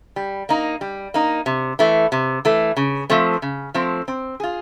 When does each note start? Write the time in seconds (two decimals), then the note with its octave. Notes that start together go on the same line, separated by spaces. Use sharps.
0.16 G3
0.49 A#3 D#4
0.81 G3
1.14 A#3 D#4
1.46 C3
1.79 E3 A3
2.12 C3
2.45 E3 A3
2.77 C#3
3.10 F3 A3 C4
3.42 C#3
3.74 F3 A3 C4
4.08 C4
4.40 F4 G#4